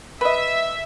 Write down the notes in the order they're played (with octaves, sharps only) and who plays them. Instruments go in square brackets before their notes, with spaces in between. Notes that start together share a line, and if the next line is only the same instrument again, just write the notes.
[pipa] B4 D#5 [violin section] E5